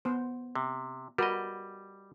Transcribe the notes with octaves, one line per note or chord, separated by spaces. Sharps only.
B3 C5
C3
G3 F#4 A#4 B4 D#5